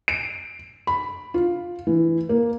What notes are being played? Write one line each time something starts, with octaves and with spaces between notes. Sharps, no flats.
D7
B5
F4
E3
A#3